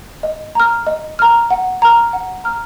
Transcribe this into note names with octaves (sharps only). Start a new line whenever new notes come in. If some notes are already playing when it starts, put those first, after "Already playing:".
D#5
A#5 F6
D#5
A#5 F6
F#5
A#5 F6
F#5
A#5 F6